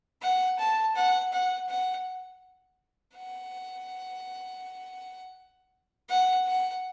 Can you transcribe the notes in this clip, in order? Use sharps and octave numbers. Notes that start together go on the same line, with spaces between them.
F#5
A5
F#5
F#5
F#5
F#5
F#5
F#5